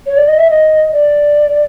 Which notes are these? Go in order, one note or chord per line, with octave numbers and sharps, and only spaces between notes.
C#5
D5
D#5
E5
D#5
D5